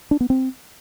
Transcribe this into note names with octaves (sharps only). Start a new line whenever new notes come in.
D4
B3
C4